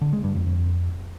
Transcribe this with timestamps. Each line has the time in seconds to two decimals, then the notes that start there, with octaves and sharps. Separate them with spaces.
0.01 D3
0.13 G#3
0.24 G2
0.35 F2
0.46 F2